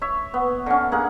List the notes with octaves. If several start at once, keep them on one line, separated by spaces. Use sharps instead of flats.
C#5 E5
B3
D3 C#4
A#3 G#4 F#5